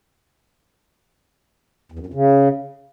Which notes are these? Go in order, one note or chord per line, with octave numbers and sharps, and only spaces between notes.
E2
F#2
F2
C#3